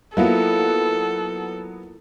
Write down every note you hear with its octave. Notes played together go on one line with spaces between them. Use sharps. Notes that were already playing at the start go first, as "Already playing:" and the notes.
F#3 A#3 B3 E4 F4 A4